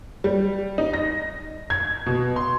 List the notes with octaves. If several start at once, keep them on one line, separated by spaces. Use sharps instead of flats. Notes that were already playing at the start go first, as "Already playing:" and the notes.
G3
D#4
A#6
G#6
B2
C6